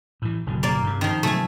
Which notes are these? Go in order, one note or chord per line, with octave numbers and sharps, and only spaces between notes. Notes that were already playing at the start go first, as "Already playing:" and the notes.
A2 E3
F#1 B2 D3
A#3 D5
G2 C3
D#3 F3
C3 D#3 F#3 A3 G#5